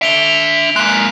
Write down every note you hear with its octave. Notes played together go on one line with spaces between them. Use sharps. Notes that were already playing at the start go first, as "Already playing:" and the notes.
D4 E5 D7 F7 G7
G#3 A#3 F#6